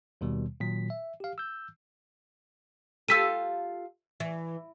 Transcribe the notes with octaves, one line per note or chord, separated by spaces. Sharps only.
D#2 B2 D#3 G3
A#2 D#3 F#3 B6
E5
G4 F5
E6 G6
F4 G4 A4 E6 B6 D#7
E3